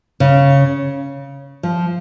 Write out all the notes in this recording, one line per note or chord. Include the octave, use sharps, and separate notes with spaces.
C#3
F3